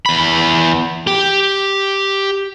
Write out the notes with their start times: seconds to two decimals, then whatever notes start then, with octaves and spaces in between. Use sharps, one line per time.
0.06 E2 B5
1.07 G4